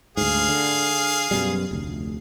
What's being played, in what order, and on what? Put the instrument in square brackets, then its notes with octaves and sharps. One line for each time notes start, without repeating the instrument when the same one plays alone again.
[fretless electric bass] D2 G#2 [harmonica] G#4 F5
[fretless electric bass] D3
F#2 B2 G3
F1 D2